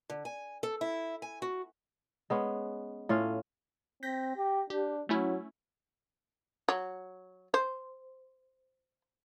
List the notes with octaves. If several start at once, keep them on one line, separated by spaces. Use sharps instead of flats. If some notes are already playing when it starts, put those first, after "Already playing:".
D3
G#5
A4
E4
G#5
F#4
G#3 B3 C#4
A2 C#4 F4
C4 G6 A#6 B6
G4
D4 G4
F#3 A3 C#4 E4
F#3
C5